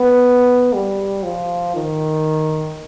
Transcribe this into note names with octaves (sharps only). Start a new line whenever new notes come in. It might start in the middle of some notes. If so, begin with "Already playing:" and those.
Already playing: B3
G3
F3
D#3